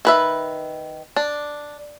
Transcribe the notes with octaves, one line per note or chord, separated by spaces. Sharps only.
D#3 B4 E5
D4